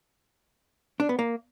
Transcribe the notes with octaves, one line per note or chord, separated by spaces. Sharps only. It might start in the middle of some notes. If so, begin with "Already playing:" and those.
D4
B3
A#3